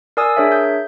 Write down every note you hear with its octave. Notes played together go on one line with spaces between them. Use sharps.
A#4 D5 G#5 D#6 E6
D4 G#4 A#4 C#5 E5
G6